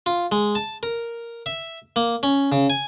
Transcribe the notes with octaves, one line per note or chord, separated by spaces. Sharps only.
F4
G#3
A5
A#4
E5
A#3
C#4
C#3
G#5